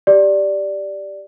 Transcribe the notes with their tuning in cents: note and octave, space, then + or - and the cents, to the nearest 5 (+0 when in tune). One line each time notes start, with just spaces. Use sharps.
G4 +0 D5 +0